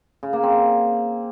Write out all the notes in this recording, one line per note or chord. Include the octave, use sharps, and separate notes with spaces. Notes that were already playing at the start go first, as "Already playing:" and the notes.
C#3
A#3
C4